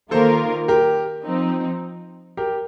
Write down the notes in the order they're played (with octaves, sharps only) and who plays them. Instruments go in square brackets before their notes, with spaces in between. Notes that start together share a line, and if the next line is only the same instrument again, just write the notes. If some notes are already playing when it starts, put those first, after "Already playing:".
[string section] D#3 A#3 F4 A#4 [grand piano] A4 C5
[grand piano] G4 A#4
[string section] F3 C4 D#4
[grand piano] G4 A#4